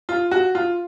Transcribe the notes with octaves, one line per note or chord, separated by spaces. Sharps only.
F4
F#4
F4